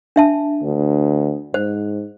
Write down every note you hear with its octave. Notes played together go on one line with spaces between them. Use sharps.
D4 E5 A5
D2
G#2 C5